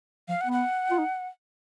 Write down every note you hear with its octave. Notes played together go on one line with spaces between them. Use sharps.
F3 F5
F#5
B3
F#5
F4
D#4